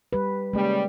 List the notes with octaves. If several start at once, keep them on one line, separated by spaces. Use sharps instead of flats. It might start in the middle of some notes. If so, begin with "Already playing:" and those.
G3 G4 B4
C#3 G3 G#3 A#3